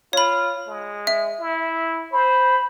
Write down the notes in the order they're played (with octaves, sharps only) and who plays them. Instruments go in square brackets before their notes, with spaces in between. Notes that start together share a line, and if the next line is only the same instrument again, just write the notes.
[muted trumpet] F4 [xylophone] C#5 B5
[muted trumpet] G#3
[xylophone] E5
[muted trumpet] E4
[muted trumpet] C5 [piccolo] B5